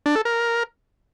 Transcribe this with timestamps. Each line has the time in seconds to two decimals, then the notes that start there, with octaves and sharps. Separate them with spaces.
0.06 D4
0.16 A4
0.25 A#4